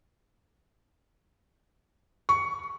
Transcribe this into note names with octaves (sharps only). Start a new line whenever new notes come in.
C#6